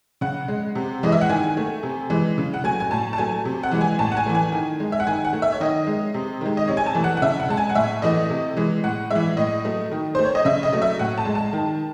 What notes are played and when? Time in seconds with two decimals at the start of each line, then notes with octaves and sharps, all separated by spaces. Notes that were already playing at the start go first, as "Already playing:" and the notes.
0.21 C#3 F#5
0.48 G#3
0.75 C3
1.03 E3 G#3 D#5
1.12 E5
1.21 F#5
1.29 D#3 G#5
1.57 A3
1.83 C3
2.10 E3 G#3
2.38 C#3
2.54 F#5
2.64 F#3 A3 G#5
2.80 G#5
2.91 A2 A5
3.13 A5
3.18 F#3 A3 G#5
3.45 C3
3.63 F#5
3.71 E3 G#3
3.81 G#5
3.99 A2 A5
4.12 F#5
4.17 G#5
4.26 E3 A3
4.35 G#5
4.52 D#3
4.80 G#3
4.92 E5
5.00 F#5
5.07 D#3 G#5
5.25 F#5
5.33 A3
5.42 E5
5.52 C#5
5.60 D#3 D#5
5.87 G#3
6.14 C3
6.41 D#3 G#3
6.57 D#5
6.68 C3 C#5
6.77 G#5
6.86 A5
6.95 E3 A3
7.04 F#5
7.17 F#5
7.22 C#3 E5
7.40 F#5
7.49 G#3 A5
7.57 G#5
7.69 F#5
7.75 A2 E5
8.02 E3 A3 D#5
8.30 C3
8.57 E3 G#3
8.83 A2 F#5
9.11 E3 G#3 E5
9.37 A2 D#5
9.64 F#3 A3
9.91 D#3
10.15 A3 C5
10.25 C#5
10.35 D#5
10.45 C#3 E5
10.63 D#5
10.72 F#3 A3
10.82 E5
10.99 A2 F#5
11.18 A5
11.25 G#3
11.35 A5
11.53 D#3